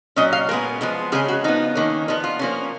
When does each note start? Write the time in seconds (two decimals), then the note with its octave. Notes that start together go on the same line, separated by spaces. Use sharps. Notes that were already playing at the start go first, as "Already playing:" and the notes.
0.16 A#2 F#3 C#4 D#5
0.33 F5
0.49 A#2 G#3 B3 A#4
0.81 F3 G#3 B3
1.12 C#3 G#3 C#4 G#4
1.28 F#4
1.44 F3 B3 D#4
1.75 D#3 A#3 C#4
2.08 F3 B3 D#4
2.24 F4
2.39 F3 A#3 C#4